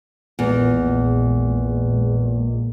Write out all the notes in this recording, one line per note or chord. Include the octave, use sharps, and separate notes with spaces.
A#1 E2 A#2 G#3